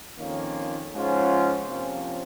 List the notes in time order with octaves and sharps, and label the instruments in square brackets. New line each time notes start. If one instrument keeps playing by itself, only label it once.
[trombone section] F2 D#3 A#3 C#4 F4
G#2 F3 G#3 C#4 F4
C3 F3 A#3 C#4 F4